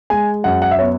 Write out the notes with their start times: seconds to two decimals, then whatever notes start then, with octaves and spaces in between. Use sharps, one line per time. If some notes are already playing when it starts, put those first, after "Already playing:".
0.10 G#3 G#5
0.44 F#2 F#5
0.62 F#5
0.71 E5
0.79 B3 C#5